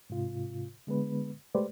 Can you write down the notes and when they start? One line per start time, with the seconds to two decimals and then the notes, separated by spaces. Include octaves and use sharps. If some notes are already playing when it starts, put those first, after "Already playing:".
0.10 G#2 C3 F4
0.87 D3 G#3 B3 B4
1.55 G#3 A3 G4 B4 C5 D5